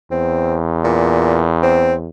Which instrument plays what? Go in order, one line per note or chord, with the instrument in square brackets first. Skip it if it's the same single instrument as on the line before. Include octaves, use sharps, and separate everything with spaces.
[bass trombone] E2 [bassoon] C4
[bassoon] A#2
C4